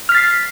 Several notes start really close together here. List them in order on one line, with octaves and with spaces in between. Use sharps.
F6 B6 A6 C7